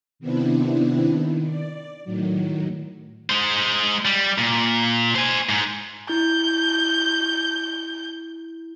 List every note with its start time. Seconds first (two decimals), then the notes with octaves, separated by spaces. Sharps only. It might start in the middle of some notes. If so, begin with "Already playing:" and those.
0.19 C3 D#3 B3 C4 D4 E4
1.13 D#3
1.46 D5
2.04 A2 D#3 F#3
3.30 G#3 C5
4.05 G3
4.38 A#2
5.15 C5 G#5
5.49 G#2
6.09 E4 G6